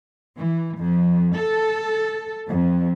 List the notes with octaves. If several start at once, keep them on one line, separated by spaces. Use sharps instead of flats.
E3
F2
A4
F2